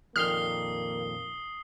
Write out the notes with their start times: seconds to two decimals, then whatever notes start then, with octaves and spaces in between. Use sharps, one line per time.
0.16 F2 A#2 D#3 A#3 D#6 F6 C7 G7